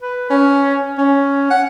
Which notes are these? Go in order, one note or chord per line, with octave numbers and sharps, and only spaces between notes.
B4
C#4
C#4
F#5